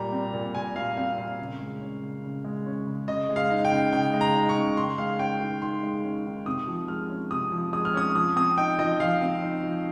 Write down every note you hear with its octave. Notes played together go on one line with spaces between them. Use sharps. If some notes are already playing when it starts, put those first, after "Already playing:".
Already playing: A#2 G3 A#5
C4
A#2
A#2 G#5
G3 F5
C4 F5
A#2 F5
C#3
G#3
C#4
C#3
C#3
G#3
C#4
C#3
C#3 D#5
G#3
F5
D#4
G5
C#3
C#3 G5
G#3
A#5
D#4
C#6
C#3
D#3 C6
G#3 F5
C#4 G5
D#3
D#3 C6
G#3
C#4
D#3
C3 D#6
F3
G#3 F6
C#4
C3 D#6
F3
G#3 D#6
F6
C#4 D#6
F3 D#6
C4 D#6
D#4 G5
F3 D#5
F3 F5
C4
D#4
F3